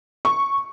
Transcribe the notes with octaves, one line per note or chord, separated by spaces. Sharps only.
C#6